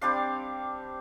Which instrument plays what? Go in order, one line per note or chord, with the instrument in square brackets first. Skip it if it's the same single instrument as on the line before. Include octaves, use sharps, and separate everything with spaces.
[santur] G3 C4 D4 F5